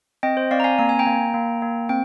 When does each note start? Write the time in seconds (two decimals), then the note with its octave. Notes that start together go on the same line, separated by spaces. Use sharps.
0.23 C4 D#5 G5
0.37 C5
0.51 C4 D5 F5
0.60 A#5
0.64 F5 G#5
0.79 A#3 A#5
0.89 G#5
0.99 G5 A#5
1.07 A#3
1.34 A#3
1.62 A#3
1.89 C4 G5